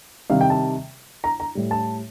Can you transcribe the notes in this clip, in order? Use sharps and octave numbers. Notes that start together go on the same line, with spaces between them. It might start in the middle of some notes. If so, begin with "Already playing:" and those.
C3 D#3 G3 F5
G5
A5
A#5
A#5
A2 G3
A5